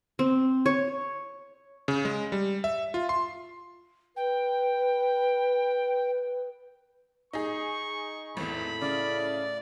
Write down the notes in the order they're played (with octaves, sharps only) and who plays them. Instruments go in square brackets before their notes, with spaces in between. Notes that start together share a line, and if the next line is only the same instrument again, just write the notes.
[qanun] C4
C#5
[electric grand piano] C#3
G#3
G3
E5
F4
C6
[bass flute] B4 [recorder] G5
[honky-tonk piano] D#4 G#4 [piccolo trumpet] C#6
[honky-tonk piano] G#1 E2 [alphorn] A2 [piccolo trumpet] B5
[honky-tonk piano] C#3 [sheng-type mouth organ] D5